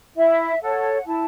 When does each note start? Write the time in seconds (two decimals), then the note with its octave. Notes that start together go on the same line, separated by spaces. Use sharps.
0.16 E4 E5
0.61 A4 C#5 F#5
1.06 E4 A5